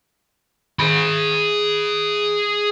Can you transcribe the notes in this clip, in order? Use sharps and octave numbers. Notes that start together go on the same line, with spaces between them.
G#4 B5